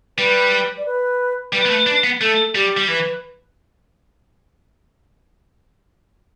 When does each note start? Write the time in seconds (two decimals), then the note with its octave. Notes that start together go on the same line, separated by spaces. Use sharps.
0.18 G3 B4
0.78 D5
0.86 B4
1.53 G3 B4
1.65 B3
1.70 A3
1.86 D4
2.04 B3
2.21 A3 A4
2.55 G3 G4
2.77 G3
2.88 E3 B4